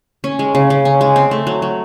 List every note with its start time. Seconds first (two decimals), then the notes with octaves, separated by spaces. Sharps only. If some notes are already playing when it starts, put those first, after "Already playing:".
0.24 C#4
0.39 G#3
0.55 C#3
0.70 C#3
0.85 C#4
1.01 G#3
1.16 C4
1.31 A3
1.47 F#3
1.62 F#3